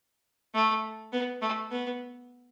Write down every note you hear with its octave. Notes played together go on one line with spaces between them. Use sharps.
A3
B3
A3
B3